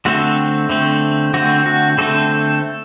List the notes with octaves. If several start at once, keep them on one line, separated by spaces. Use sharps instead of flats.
D3 A3 C4 F#4
D3 A3 C4
D3 A3 C4 F#4
F#4
D3 A3 C4 A4